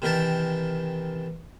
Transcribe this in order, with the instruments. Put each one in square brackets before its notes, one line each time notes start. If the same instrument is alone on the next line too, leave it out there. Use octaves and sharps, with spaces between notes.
[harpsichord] C3 D#3 E3 A#4 G5 A5